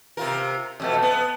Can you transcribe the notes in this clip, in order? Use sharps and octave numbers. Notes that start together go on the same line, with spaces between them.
C3 F4 A#4
F2 B2 A3
B3